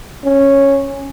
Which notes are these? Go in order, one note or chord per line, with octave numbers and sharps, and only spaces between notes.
C#4